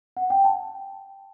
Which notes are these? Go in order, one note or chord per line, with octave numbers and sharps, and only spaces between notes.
F#5
G5
A5